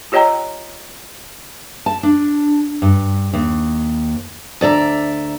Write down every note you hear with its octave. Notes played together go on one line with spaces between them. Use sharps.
F4 G4 C#5 D#5 G5 A#5
A5
D4
G2
D#2
D2 D5 E5 A#5